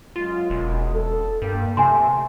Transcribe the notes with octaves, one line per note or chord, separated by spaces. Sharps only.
F#2 G#3 F4
E1
A4
G2 A#3 G5
C3 A3 G#5 C6